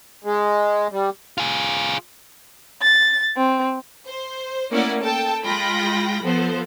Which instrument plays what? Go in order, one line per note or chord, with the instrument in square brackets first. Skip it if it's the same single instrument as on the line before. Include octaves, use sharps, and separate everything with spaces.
[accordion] G#3
G3
[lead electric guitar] F4 G#4
[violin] A6
C4
[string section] C5
A3 A#3 C#4 E4 D5 F#5
A4 G5 A5
G#3 F4 G5 B5 A#6
F3 B3 A4 C5